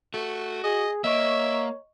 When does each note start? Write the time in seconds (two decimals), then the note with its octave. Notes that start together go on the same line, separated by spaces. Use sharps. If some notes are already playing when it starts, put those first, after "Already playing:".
0.14 A3 F#4
0.64 G#4 D#5
1.04 A#3 C#5 D#5 E5 C#6